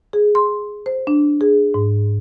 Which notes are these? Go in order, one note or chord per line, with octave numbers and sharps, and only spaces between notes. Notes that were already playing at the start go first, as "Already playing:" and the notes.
G#4
C6
C5
D4
G#4
G#2